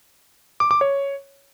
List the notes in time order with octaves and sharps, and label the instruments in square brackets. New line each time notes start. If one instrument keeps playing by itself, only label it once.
[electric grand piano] D6
D6
C#5